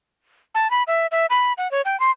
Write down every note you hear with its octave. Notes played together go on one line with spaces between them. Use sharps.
A5
B5
E5
E5
B5
F#5
C#5
G5
C6